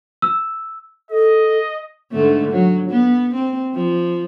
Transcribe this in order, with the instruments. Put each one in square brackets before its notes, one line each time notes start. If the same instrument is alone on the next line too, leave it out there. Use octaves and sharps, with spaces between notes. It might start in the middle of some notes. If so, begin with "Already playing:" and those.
[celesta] E6
[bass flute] A4 [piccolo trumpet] D#5
[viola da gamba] G#2 D3 A3
F#3
B3
C4
F3